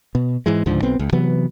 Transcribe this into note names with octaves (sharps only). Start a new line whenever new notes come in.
B2
G#2 E3 G#3
C#2 G#2 D3 F3
B1 B3 C4
C#2
C3 E3 F#3 B3